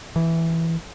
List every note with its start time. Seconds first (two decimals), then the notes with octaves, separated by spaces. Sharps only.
0.16 E3